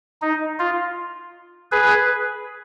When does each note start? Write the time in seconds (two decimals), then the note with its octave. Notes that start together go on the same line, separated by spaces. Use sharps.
0.22 D#4
0.59 F4
1.72 G#4 B4